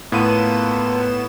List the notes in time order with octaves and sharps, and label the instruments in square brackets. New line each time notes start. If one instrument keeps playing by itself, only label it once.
[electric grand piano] A2 D#7 [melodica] A#3 F4 A4 [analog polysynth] B3 E7